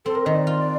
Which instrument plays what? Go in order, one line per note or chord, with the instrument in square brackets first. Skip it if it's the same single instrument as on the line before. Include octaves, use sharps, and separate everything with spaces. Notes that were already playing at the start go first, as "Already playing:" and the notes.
[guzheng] C4 [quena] A4
[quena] A#4
[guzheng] D#3 [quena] D#5
[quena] D5
[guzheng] F4